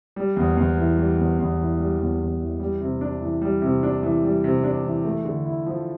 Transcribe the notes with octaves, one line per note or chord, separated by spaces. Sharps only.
G3
E2
E2
E3
G3
E2
E2
E3
G3
E2
E2
E3
G3
C3
D4
E3
G3
C3
D4
E3
G3
C3
D4
E3
A3
D3
E4
F3